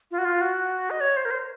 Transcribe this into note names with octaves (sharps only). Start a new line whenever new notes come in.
F4
F#4
F4
F#4
D#5
C#5
C5
A#4
C5